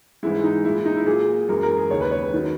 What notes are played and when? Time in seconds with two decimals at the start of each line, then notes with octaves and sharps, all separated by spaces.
0.23 G#2 E3 G#3 E4
0.44 D#4
0.65 A#2 G#3 E4
0.75 E4
0.85 D#4
0.97 E4
1.06 A#2 F#3 G#4
1.49 F#2 E3 G#3 A#4
1.63 A#4
1.77 G#4
1.90 D#2 C#3 G#3 C#5
2.01 B4
2.11 C#5
2.22 B4
2.34 D#3 F#3